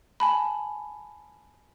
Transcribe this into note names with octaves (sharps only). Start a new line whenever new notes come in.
G#5 A5 B5